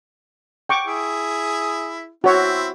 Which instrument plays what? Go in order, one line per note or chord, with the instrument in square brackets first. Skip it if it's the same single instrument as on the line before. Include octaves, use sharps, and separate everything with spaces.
[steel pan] G5 C#6 D6
[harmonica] E4 G#4
[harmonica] C4 E4 [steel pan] F#4 C#5